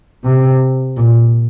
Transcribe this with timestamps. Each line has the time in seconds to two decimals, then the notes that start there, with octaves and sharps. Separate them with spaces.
0.25 C3
0.97 A#2